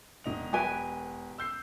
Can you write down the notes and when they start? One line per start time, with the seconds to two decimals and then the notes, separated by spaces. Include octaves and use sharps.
0.24 E1 D#5 F7
0.53 G4 B4 G#5
1.38 E6 G6 C7